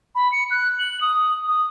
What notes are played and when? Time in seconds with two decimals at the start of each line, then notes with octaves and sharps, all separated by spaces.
0.15 B5
0.32 C#7
0.51 F#6
0.79 F#7
1.01 D#6
1.48 D#6